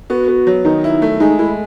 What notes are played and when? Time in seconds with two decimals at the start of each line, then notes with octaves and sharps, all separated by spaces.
0.10 B3 F#4
0.28 B3
0.47 F#3
0.65 D#3 D#4
0.84 E4
1.02 A3
1.20 G#3 D#4
1.39 G#3 E4